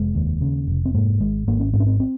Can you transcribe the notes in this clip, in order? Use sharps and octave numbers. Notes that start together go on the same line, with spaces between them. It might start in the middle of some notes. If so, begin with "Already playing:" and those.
Already playing: F1 G#3
D#2
C#3
F1
C4
G#2 A#3
G#1 G#3
G#1 A#3
C#4
G#2 C4
C#4
C4
C4